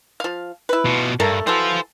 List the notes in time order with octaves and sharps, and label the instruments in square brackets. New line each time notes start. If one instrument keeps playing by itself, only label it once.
[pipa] F3 F5
E4 B4
[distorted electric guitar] B2 F4
[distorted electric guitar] G2 [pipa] A3 A4 A#4
[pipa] E3 F#3 A4 [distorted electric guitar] F4 C5